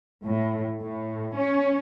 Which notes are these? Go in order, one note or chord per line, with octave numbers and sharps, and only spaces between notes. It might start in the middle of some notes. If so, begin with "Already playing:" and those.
A2
A2
C#4